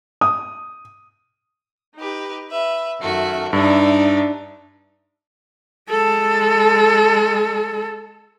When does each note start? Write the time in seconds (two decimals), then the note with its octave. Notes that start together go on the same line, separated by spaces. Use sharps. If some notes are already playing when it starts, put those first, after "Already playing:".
0.21 D#6
1.97 D#4 G4 B4
2.50 B4 E5
3.01 F#2 D#3 A3 F#4 E5
3.53 G2 D4 D#4 E5
5.90 G#3 A4